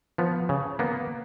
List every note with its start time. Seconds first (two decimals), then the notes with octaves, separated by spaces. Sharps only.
0.18 F3 B3
0.49 C#3
0.79 A#3 B3